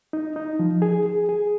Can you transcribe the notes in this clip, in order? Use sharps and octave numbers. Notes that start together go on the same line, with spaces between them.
D#4
D#4
F3
G#4
G#4
G#4